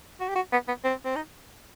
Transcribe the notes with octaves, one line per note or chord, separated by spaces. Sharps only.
F#4
G4
F#4
B3
B3
C4
C4
D#4